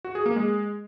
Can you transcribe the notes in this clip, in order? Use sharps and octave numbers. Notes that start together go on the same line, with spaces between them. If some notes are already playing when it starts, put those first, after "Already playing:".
F#4
G#4
A#3
G#3